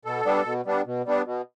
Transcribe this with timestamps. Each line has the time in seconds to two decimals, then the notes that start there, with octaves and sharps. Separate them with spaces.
0.05 B2 A4
0.25 G3 B3 D4
0.45 B2
0.66 G3 B3 D4
0.86 B2
1.06 G3 B3 D4
1.26 B2